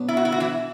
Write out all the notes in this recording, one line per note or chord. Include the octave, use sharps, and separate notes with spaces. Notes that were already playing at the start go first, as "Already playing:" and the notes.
Already playing: B2 F#3 B3 D4
E4
F#4
E4
F#4
E3 E4